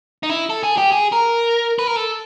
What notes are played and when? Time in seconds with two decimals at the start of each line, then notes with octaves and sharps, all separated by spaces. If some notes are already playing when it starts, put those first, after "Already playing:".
0.23 D#4
0.29 E4
0.50 A4
0.64 G#4
0.78 G4
0.92 G#4
1.13 A#4
1.79 B4
1.87 A#4
1.96 A4